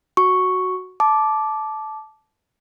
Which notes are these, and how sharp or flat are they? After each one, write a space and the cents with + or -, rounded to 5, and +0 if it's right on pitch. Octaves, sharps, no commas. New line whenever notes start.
F#4 +0 C#6 +0
A5 -15 D6 +0